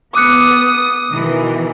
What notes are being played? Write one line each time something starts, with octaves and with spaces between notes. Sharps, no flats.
B3 D6 D#6 F#6 C#7
B2 D#3 E3